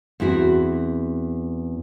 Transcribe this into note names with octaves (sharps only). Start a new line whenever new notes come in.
E2 C4 E4 F#4